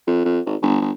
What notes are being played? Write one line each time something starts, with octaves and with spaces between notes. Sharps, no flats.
F2
F2
G#1
G1
G1